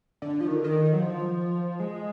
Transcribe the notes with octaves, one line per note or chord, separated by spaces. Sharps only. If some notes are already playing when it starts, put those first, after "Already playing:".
D3
F3
D#3
D3
D#3
F#3
F3
G#3